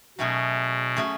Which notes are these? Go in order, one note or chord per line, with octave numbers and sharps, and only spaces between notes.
B2 F#3 A3 C#4 G#4
F#3 A3 C#4 G#4